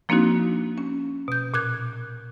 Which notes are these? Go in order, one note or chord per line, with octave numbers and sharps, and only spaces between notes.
F3 A#3 C4 D4 D#4 F#4
C#4
B2 G6
A#2 F#6 G#6